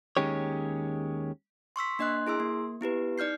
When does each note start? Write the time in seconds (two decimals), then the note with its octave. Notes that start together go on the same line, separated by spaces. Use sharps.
0.17 D#2 D#3 G#3 C#4 G4 C#5
1.76 C6 C#6 E6 B6
1.99 A#3 D4 D#5 C6 F#6
2.27 E4 G#4 C6 E6
2.40 A#3
2.81 B3 E4 G4 B4
3.18 D#4 D5 F6 G6 C7